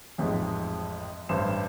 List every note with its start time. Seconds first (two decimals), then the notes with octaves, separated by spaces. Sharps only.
0.18 A1 F2 G#2 F3 G#3
1.29 A1 G2 C5 E7